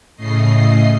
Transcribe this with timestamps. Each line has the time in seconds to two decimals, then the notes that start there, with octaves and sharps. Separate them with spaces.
0.16 A2 C#3 A3 D#5 C7